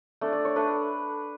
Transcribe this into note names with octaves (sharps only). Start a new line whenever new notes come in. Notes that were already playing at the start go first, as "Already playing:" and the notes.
A3 D4 D5
D5
C#5
A3 D4 B4